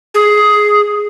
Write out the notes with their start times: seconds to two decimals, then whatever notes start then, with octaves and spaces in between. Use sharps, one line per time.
0.14 G#4